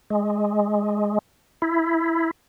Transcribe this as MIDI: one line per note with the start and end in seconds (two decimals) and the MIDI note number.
0.10 1.18 56
1.62 2.31 64